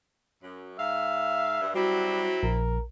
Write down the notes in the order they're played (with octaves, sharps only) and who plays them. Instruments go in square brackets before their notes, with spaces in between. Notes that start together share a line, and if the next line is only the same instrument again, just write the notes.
[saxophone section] F#2
[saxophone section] G#2 F5 [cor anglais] E5
[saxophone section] G2
[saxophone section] F#3 C4 E4 [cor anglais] G3 [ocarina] F#4
[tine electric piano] A#1 [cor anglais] A#4